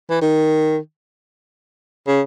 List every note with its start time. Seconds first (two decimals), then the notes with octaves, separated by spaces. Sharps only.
0.10 E3
0.22 D#3
2.08 C#3